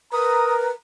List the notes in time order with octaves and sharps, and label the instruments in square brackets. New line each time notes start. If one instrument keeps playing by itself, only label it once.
[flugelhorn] A#4 [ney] B4 [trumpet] A#5 [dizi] D#6